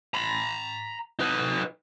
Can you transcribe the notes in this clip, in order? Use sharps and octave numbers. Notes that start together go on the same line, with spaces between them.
A#5 B5
D#4 B4